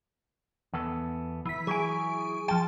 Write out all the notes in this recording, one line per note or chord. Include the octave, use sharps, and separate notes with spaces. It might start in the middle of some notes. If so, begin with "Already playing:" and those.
E2 B3 A4
E3 B6
F#3 E4 G#4 G#5 D7
F3 G5 A5